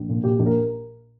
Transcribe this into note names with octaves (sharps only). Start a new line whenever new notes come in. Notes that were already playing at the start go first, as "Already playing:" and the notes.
Already playing: A#1
A#2
A#2 G4
A#1
A#4